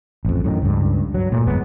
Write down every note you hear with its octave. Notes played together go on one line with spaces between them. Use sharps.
A1 F2
F#2 A2 D#3
C#2 G2
F#3
A#2 A3
G1 F2 G#3 B3